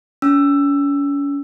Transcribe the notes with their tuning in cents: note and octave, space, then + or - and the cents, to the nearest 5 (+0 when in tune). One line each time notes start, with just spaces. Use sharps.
C#4 +35 E6 +15